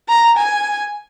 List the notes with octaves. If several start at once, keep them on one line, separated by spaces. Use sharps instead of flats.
A#5
G#5